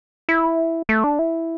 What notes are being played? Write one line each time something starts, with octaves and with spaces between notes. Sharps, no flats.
E4
A3
D4
E4